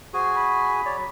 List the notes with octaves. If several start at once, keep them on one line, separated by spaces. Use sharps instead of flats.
F#4 G#4 C5 G#5
B5
C#5 D5
F#3